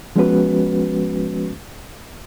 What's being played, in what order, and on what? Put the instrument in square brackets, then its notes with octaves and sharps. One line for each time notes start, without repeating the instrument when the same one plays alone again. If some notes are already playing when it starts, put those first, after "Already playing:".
[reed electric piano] F3 G#3 B3 C#4 F#4 B4